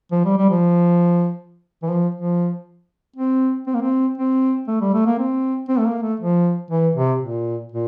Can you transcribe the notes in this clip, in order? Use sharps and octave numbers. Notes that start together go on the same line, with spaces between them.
F3
G3
G3
F3
E3
F3
F3
C4
C4
A#3
C4
C4
A3
G3
A3
A#3
C4
C4
A3
A#3
A3
F3
E3
C3
A#2
A#2